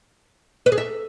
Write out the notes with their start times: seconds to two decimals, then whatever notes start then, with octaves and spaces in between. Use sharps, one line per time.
0.66 B4
0.72 G#4
0.78 E5